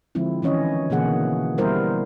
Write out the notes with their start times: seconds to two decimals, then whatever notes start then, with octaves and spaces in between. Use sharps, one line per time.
0.15 D3 F3 G#3 C4 E4
0.42 D#3 E3 C#4 C#5 D#5
0.90 B2 D3 E3 A#3 G#4 F#5
1.58 G3 B3 E4 A#4 C5